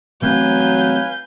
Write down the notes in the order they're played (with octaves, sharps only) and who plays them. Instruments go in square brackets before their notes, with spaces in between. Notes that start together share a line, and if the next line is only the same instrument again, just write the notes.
[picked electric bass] E3 A3 C4 [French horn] F#3 [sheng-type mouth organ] B4 F5 G#5 [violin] G6